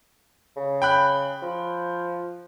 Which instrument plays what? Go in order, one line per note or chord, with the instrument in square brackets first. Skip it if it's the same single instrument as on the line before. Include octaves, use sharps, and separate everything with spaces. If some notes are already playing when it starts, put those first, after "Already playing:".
[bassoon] C#3
[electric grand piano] G5 B5 F#6
[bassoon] F3